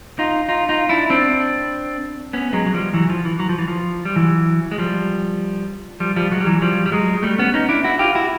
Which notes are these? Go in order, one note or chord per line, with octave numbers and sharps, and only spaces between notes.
D#4 F4
D#4 F4
D#4 F4
D4 E4
C4 D4
B3 C#4
F#3 G#3
F#3
F3 G3
E3 F#3
F3
E3
F#3
F3
E3
F3
G3
E3 F#3
G#3
F3 G3
F3 G3
F3 G3
F#3 G#3
G3
E3 F#3
F3 G3
G3
F#3 G#3
G3 A3
B3 C#4
C#4 D#4
D4 E4
E4 F#4
F4 G4
E4 F#4